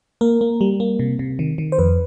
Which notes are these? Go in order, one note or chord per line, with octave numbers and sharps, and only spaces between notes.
A#3 A#4
A#3
G3
A#3
C3
C3
D#3
D#3
C5
F2 B4